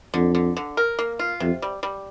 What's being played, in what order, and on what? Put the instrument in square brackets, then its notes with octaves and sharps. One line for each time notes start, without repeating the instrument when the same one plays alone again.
[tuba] F2 [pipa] D3
[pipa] D3
D3
A#4
A#3
F4
[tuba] F2 [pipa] C3
[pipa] G3
G3